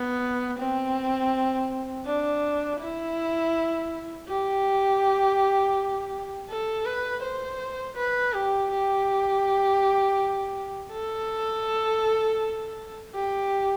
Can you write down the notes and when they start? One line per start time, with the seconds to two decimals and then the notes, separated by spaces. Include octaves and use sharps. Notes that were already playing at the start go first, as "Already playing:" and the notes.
Already playing: B3
0.59 C4
2.06 D4
2.80 E4
4.28 G4
6.49 A4
6.86 B4
7.23 C5
7.97 B4
8.33 G4
8.71 G4
10.92 A4
13.14 G4